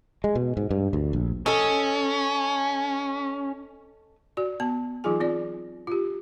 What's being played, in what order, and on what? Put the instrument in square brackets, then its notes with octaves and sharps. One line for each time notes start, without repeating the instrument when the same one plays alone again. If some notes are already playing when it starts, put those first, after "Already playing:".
[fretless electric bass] G#3
B2
G#2
G2
D2
A#1
[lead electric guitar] C#4 [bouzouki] A4 D#5
[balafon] F#4 D5
B3 A5
E3 F#3 D#4 F4 G#4 G#5
C4 F4 D5
F4 G4